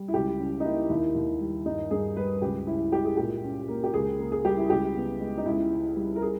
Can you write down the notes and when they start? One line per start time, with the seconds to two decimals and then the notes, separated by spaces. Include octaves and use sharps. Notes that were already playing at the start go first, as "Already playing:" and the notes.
Already playing: G3
0.08 E4
0.14 C#2 G4
0.39 C#4
0.60 D#4
0.64 A#3 E4
0.89 D#2 E4
1.15 D#2
1.41 G3
1.66 G2 D#4
1.91 G2 G#4
2.16 G3 B4
2.42 C#2 G4
2.67 C#4 E4
2.92 G#3 G4
3.05 G#4
3.17 A#2 G4
3.43 C#4
3.68 A#3
3.84 G4
3.94 C#2 G#4
4.19 A#3
4.32 G#4
4.44 G3 G4
4.57 E4
4.70 C#2 G4
4.95 B3
5.20 G#3
5.38 D#4
5.45 C#2 E4
5.71 C#4
5.96 G3
6.16 A#4
6.22 G#4